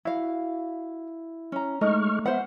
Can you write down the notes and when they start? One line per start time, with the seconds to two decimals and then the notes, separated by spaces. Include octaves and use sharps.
0.05 E4 F#4 F5
1.52 C#4 A#5
1.81 G#3 A3 D#4 D#5 C#6 F6
2.26 B3 C5 E5 F#5